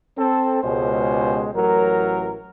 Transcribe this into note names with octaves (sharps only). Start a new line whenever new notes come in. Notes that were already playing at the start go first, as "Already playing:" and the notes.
C4 A4
C#2 B2 G#3 C#4 G4 C5
A1 A2 F#3 A#4